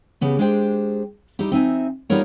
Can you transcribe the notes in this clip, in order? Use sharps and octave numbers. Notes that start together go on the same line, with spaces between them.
C#3 B3 G4
G#3 D4 G4 C5 G5
G3 D#4 E4 G4
C4 D#4 E5 G#5
G3 B3 D#4 F4 A#4 C#5